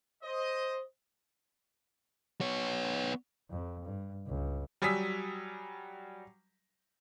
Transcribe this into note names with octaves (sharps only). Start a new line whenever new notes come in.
C5 D#5
B3 C#5
F2
G2
C#2
F#3 G3 G#5 D#6 E6 B6